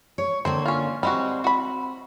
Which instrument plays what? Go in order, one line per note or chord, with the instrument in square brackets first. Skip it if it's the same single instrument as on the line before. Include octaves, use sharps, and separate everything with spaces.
[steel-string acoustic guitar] C#5
[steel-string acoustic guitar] D3 A#3 C#5 [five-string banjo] C4 C5
[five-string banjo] C#4 F4
[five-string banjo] G3 G#3 F#4 [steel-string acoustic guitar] C4
[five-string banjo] F#4 B5